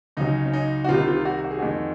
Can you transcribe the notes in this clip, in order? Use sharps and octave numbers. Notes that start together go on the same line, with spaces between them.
C#2 C#3 F#3 D#4
C#4
D#4
F#4
C2 C3 D#3 F4
F4
F#4
F#4
G#4
F2 D#3 G#3 F#4